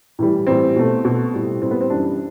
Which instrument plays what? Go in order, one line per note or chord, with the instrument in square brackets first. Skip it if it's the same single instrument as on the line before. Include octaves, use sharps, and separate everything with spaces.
[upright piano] A2 E3 G3
A2 E3 G3 C4
B2 A3
B2 A3
A2 G3
A2 G3 C4
B3
C4
F#2 E3 G3 D4